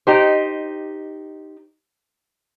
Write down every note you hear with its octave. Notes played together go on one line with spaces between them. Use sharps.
D#4 G4 C5